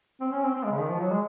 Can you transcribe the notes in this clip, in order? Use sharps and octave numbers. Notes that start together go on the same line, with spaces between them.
C4
C#4
C4
C4
G#3
C#3
D#3
F3
F#3
G#3